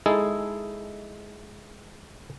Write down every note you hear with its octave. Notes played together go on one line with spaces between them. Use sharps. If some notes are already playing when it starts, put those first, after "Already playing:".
G#3 D#4 E4 G#4 A4